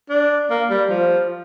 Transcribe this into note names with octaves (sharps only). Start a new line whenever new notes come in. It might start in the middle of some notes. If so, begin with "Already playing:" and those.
D4
A#3
G3
F3